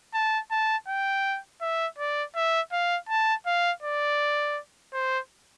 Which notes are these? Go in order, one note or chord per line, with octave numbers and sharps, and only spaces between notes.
A5
A5
G5
E5
D5
E5
F5
A5
F5
D5
C5